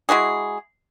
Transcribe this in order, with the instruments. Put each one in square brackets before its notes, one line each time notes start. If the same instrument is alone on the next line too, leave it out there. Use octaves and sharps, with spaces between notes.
[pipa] G#3 E4 F#4 G#4